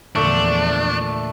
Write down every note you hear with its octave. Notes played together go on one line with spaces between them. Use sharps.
E2 A#2 D3 F3 A3 D4 C#6